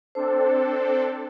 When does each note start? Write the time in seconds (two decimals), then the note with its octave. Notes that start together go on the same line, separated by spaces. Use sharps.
0.15 C4 D4 A4 C5